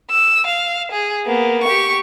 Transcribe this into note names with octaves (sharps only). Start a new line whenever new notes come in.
E6
F5
G#4
A#3 B3
G4 C#6